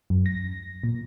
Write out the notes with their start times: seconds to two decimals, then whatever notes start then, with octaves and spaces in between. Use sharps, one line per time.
0.10 F#2
0.26 A#6
0.83 A#2